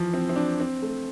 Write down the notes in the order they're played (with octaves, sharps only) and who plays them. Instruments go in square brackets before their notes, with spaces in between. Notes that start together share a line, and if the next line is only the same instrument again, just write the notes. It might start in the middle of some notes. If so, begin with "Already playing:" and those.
Already playing: [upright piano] E3 F3
C4
C4
D4
C4
A3